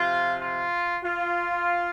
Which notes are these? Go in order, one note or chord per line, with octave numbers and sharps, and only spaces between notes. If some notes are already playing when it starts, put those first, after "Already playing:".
Already playing: C3 F3 F4
F4
F4